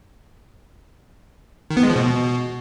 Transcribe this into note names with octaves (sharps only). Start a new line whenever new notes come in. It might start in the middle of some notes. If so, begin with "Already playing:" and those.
D#3
B3
G#3
F3
B2